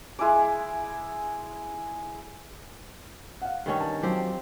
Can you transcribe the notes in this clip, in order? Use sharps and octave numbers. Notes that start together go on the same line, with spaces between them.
G#3 E4 G#5 D6
F5 F#5
G2 D#3 C#4
A5
F3 F#3 C4 G4